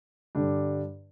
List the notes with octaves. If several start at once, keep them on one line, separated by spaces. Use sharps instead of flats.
G2 D3 G3 D4